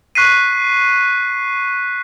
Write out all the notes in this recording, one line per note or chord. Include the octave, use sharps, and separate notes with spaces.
C#6 F#6 B6 C7 D#7